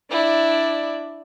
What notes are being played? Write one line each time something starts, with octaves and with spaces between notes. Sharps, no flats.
D4 E4 D5